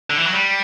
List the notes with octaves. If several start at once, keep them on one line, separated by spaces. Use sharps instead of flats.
D3
E3
F#3
G3